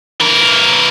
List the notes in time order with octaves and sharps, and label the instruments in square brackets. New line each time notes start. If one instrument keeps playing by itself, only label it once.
[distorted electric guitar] E3 A#4